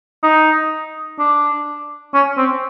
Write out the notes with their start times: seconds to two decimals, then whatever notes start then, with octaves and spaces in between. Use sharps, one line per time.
0.23 D#4
1.19 D4
2.14 C#4
2.38 C4